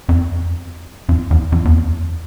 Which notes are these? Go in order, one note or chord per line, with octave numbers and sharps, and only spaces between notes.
F2
F2
E2
F2
E2
F2